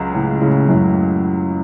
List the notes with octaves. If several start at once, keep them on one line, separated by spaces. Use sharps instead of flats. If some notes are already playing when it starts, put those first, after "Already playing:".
Already playing: C#2 F#3
A2 C#3
A2 C#3
F#2 A2